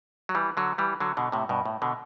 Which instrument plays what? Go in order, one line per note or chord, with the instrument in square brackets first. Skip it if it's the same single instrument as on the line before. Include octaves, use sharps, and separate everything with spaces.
[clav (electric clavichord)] F#3
E3 G3
D3 F#3
E3 G3
D3 F#3
B2 D3
A2 C3
G2 B2
A2
B2 D3